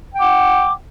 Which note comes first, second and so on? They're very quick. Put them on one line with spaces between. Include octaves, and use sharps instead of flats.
G5 F#5 D6